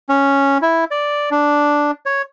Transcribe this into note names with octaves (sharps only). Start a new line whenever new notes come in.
C#4
E4
D5
D4
C#5